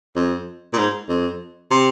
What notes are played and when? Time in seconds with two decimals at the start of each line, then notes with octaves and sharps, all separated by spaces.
0.16 F2
0.73 A#2
0.78 G#2
1.09 F2
1.71 C3